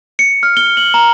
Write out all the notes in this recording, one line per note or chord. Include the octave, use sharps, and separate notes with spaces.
C#7
F6
G7
F#7
A#5